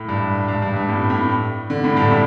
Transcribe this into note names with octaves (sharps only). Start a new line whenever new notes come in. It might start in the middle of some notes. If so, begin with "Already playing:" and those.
Already playing: A2
G2
G2
G2
G2
A2
A2
D3
A2
G2
A2